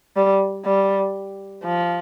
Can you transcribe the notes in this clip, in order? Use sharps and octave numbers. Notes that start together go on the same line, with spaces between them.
G3
G3
F3